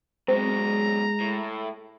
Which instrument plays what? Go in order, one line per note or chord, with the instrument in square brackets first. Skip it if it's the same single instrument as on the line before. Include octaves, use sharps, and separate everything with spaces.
[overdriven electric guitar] F#2 B2 [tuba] G#3 [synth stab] C4 [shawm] A#5
[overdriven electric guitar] A2